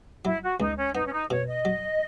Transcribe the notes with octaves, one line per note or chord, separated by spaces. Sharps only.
F#3 E4
F#4
C#2 D#4
C#4
B3 D#4
C#4
D#4
B2 C#5
D#5
F#3